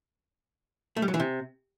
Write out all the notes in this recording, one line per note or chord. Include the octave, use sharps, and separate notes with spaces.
A3
G3
F#3
E3
C3